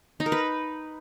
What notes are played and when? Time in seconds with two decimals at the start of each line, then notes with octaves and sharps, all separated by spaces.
0.20 D#4
0.26 A#4
0.32 B4